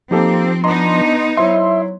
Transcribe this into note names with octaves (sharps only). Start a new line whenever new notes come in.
F3 A#3 C4 D#4 G4 A4
B3 D4 D#4 D#5 A#5 C6
F#3 E4 C5 E5 C6